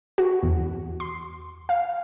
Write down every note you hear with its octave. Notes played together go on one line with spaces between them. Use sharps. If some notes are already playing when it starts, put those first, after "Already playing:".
F#4
E2
C6
F5